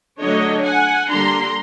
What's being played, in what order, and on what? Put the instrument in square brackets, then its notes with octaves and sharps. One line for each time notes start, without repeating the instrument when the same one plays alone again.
[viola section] D3 F#3 A3 D4 C#5 D#5
F#5 G#5
D3 G3 A#3 D4 A#5 C6